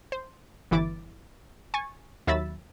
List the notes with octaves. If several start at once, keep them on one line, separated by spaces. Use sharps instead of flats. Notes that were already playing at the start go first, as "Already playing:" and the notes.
C5
G1 E3 E4 D6 A6
G#5 C#6 A6
D#2 F#3 E5 B5 E6 A6